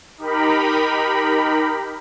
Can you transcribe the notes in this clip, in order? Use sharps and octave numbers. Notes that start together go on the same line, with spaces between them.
D#4 G4 A#4 B5